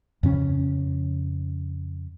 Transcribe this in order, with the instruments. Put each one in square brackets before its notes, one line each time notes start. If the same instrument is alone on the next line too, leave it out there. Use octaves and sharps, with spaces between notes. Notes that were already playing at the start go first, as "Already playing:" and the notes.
[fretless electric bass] F2 C#3 C#4